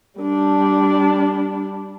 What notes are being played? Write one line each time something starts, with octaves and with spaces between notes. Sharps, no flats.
G3 D4